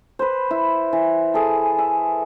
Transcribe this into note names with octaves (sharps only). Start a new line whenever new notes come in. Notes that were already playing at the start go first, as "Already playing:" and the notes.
B4 C5
E4
E3
G#4 A4
E5